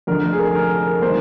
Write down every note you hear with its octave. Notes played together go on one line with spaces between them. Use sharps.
F1 F2 D3 A#4
G#4
A#4
A#4
D#3 G3 A#3 C5